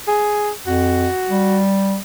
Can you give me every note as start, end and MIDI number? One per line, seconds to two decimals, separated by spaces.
0.08 0.51 68
0.67 1.08 41
0.67 1.60 66
1.31 1.98 55